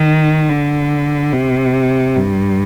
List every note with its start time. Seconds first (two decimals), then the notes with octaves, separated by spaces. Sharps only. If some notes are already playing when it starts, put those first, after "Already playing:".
Already playing: D#3
0.49 D3
1.32 C3
2.16 G2